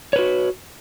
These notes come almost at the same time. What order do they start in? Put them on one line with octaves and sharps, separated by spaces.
C#5 B4 F#4